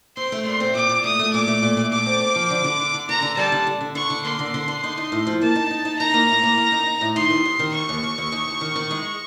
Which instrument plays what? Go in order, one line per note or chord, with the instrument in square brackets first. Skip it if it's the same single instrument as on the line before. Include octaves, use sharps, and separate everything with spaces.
[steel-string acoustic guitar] C4 [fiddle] C6
[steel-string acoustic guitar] A3
[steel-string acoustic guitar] A#2 [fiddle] C6
[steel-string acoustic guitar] C4
[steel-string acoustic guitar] A#2 [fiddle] D6
[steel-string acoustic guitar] A#2
[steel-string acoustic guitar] A3 [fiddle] D#6
[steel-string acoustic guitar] A3
[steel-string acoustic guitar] A#2 [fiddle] D6
[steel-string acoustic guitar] A3
A#2
A#2
[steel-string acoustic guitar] A3 [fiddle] D6
[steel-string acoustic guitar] C4
C4
F3
D3
D3
D3
D3
[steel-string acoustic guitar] D3 [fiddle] A#5
[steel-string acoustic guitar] D3
[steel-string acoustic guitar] G3 [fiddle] A5
[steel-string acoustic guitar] D3
D3
D3
[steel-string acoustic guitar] D3 [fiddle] C#6
[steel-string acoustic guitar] D3
[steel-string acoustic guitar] A#3 [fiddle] C6
[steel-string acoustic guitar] D3
D3
D3
D#4
D#4
A2
F3
[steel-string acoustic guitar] A#3 [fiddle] A5
[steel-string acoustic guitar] D#4
D#4
D#4
[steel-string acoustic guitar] D#4 [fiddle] A#5
[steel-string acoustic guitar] A#3
A2
A#3
A#3
D#4
D#4
A2
[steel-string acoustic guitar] D#3 [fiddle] C6
[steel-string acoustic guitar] D#2
D#2
D#3
[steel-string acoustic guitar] D#2 [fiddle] C#6
[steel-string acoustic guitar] D#2
D#2
D#2
D#2
D#2
D#3
D#3
G#3